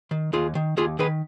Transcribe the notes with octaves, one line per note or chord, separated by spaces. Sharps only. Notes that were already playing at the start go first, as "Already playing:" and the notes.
D#3
D#2 F4 G#4
D#3
D#2 F4 G#4
D#3 G#4 B4